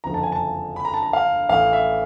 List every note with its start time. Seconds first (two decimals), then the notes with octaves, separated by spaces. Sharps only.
0.04 F#1 F2 D3 F3 A#5
0.14 A5
0.23 G#5
0.32 A5
0.76 B5
0.85 A#5
0.94 A5
1.03 A#5
1.13 F5
1.49 A1 A2 E3 A3 F5
1.73 E5